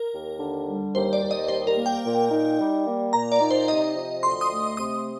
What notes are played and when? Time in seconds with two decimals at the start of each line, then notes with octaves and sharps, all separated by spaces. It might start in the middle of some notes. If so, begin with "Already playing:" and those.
Already playing: A#4
0.12 D#2
0.39 D3
0.66 G3
0.94 D#2 C5
1.13 D5
1.22 D#2
1.31 D#5
1.48 G3 C5
1.67 A#4
1.77 A#3
1.86 G5
2.04 A#2
2.31 D#4
2.59 G3
2.86 A#3
3.13 A#2 A#5
3.32 D5
3.41 D#4
3.51 C5
3.68 C3 D#5
3.96 F3
4.23 D2 C6
4.41 D#6
4.50 A3
4.77 C3 D#6